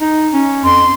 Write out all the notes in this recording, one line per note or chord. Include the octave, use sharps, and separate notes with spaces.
D#4
C#4
F2 C6